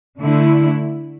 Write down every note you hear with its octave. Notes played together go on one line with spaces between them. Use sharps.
D3 A3 E4